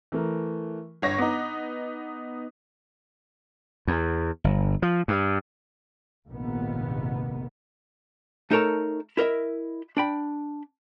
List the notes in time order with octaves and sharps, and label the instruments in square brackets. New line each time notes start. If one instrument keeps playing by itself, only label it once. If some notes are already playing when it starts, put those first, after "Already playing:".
[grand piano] E3 A3 A#4
[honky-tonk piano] G1 C#5 A#6 [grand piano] G2
[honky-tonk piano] B3 D#4 [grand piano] A#5 D6
[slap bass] E2
G1
F3
G2
[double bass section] F1 A#1 G#2 C3 D#3 B3
[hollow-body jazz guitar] A3 D#4 A4 A#4 C#5 A5
E4 A#4 D#5 E5
D4 G5 B5